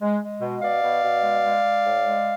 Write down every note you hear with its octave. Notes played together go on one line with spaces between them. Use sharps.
G#3
G#3
B2
B2 D5 F5
B2
B2
G#3
G#3
G#3
A2
G#3